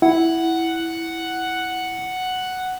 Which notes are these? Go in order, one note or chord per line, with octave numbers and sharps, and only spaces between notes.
E4 F#5